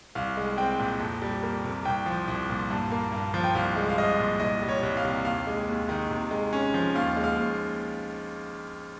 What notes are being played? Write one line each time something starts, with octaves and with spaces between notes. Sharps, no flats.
C2 F5
G#3
C4 G5
A#2
F2
G3
A#3
C3
C2 G5
F3
C2
A#2
G2
A#3
G2
F3
G5
C2 F5
G#3
F5
C2 D#5
A#2
C2 D#5
G3
C#5
C2
F5
C3
D#2 F5
G#3
D#2
D#3
C3
G#3
C#4
F3
D#2 F5
G#3
F5
D#2